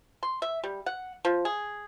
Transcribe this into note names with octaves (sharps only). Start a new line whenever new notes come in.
C6
E5
G3
F#5
F3
G#4